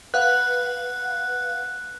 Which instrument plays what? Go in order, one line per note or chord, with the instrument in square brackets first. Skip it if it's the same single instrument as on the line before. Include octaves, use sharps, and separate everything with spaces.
[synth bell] B4 F5 F#5 [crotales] F#6